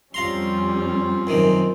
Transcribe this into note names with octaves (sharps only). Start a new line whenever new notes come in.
F2 G3 C4 C#4 F4 F5 A#5 C6
F#2 C3 D#3